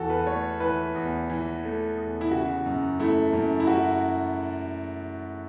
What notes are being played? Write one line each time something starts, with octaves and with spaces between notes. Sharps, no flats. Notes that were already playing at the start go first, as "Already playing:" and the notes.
Already playing: E2 E3 F#4 A4
B4
A3 C#5
E3 B4
E2
E3
A3
E2
E4
C#3 F#4
F#2
A3 E4
F#2
E4
F#2 F#4